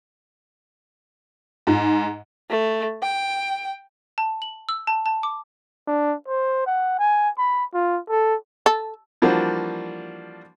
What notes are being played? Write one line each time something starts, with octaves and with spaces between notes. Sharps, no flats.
G#2
A3
G5
A5
F#7
E6
A5
A5
D6
D4
C5
F#5
G#5
B5
F4
A4
A4
E3 F3 G3 A#3 D4 F#4